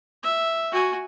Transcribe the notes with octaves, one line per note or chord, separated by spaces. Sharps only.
E5
F#4 G#5